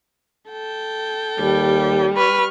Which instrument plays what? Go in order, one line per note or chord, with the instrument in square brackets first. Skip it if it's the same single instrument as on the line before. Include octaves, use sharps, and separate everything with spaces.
[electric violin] A4 G5
[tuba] D#2 [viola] G3
[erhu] B4 [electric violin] C#6 F6